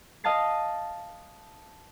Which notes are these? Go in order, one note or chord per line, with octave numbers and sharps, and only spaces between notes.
D#5 F5 A5 A6 C7